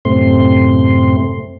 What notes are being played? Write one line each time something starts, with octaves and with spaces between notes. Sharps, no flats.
F#2 A2 C3 A3 C4 C6